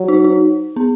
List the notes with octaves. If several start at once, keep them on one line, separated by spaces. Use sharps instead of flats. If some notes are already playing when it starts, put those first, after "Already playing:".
Already playing: F#3
D#4
D#4
B3